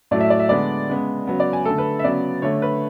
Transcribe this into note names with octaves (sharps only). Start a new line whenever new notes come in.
A2 F#3 A3 D5
E5
D5
E5
D3 G#3 B3 D5
C#3 G#3 B3
C#3 F#3 B3
D5
G#5
D3 A3 A4
B4
E5
C#3 F#3 B3 D5
D3 A3 C#5
B4